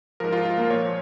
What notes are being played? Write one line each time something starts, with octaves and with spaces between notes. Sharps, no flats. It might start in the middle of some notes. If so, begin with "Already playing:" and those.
G#2 F3 A#4
F4
F4
A#3
A#2 F3 C#5